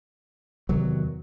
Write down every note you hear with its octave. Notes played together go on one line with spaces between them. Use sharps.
E2 C3 D#3 F#3